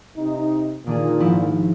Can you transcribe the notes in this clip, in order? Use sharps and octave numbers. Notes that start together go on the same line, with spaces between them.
C3 D#4
A#2 D#3 D4 G#4
G#1 F3 E4